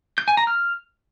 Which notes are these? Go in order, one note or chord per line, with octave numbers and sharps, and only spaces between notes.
G6
G#5
A#5
F6